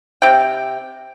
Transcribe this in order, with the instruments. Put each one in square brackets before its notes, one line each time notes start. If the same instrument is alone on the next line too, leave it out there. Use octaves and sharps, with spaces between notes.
[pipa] C3 G5